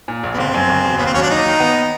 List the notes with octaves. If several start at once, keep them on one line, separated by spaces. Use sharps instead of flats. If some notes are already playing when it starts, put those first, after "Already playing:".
A#2
A#1
B3
G1 C4
F#2
G1
E1
D#2 B3
C4
F#3 C#4
D4
D#2 D#4
D#3
B3